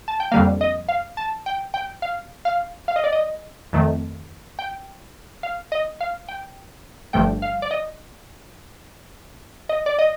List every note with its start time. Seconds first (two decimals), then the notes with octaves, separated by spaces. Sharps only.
0.08 A5
0.20 G5
0.32 F2 D3 G3 A#3 F5
0.61 D#5
0.88 F5
1.17 A5
1.46 G5
1.74 G5
2.02 F5
2.45 F5
2.88 F5
2.96 D#5
3.04 D5
3.13 D#5
3.73 F2 D#3 A3
4.59 G5
5.43 F5
5.72 D#5
6.01 F5
6.29 G5
7.13 G1 G2 F3 A3 G5
7.42 F5
7.62 D5
7.71 D#5
9.69 D#5
9.86 D5
9.99 D#5